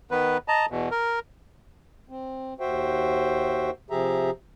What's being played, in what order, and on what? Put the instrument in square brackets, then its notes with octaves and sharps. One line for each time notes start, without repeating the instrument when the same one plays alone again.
[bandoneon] D#3 B3 B4
D#5 A5 A#5
E2 B2
A#4
[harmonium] C4
D#2 F#4 C5 E5 G5
C3 F3 G4 G#4 E5 A#5